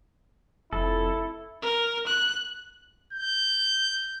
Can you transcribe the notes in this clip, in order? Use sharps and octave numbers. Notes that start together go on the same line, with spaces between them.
F1 E4 A4
A#4
F#6
G6